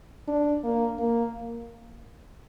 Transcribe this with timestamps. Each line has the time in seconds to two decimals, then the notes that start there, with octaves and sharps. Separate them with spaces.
0.28 D4
0.64 A#3
0.99 A#3